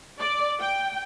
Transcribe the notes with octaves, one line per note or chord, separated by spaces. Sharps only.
D5
G5